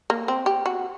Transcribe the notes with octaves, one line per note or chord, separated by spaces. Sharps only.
A#3
C4
G4
F#4